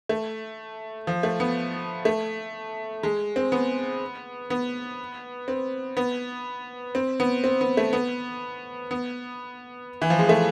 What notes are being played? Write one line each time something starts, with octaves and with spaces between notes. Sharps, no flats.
A3
F3
A3
B3
A3
G#3
C4
B3
B3
C4
B3
C4
B3
C4
B3
A3
B3
B3
E3
F3
G#3
A3